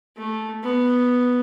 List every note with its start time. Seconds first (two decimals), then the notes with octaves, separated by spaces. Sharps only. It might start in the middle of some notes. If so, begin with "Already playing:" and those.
0.17 A3
0.64 B3